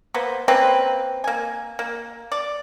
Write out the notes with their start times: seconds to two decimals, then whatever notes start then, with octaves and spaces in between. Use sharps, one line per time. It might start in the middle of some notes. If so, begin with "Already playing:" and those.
0.14 A#3 B3 C5
0.48 A#3 C4 C#4 B4
1.24 A#3 G#5
1.79 A#3
2.32 D5